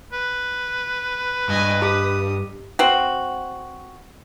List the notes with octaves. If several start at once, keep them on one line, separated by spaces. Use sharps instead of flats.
B4
G2 D#5 G#5
G4 D#6
C4 F#4